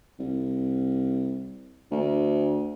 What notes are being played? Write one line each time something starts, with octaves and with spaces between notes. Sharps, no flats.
C2
D2